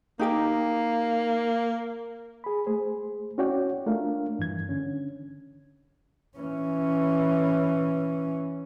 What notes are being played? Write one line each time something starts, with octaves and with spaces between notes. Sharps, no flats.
A#3 D#4 G4 A#4
G#4 B5
A3 G#4 C5
C#4 E4 F#4 C#5 D5 G5
A3 D4 F4 A#4 F5
G2 E3 G#6
D3 C#4
E3 C#4